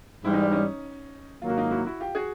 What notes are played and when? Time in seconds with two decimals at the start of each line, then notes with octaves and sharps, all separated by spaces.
0.24 G#2 E3 G3 E4
0.33 D#4
0.43 D4
0.51 C#4 D#4
1.42 G#2 D#3 F#3 A#3 F4
1.50 F#4
1.57 D#4 F4
1.71 E4 F#4
1.86 E4 F#4
2.00 F4 G4
2.15 F#4 G#4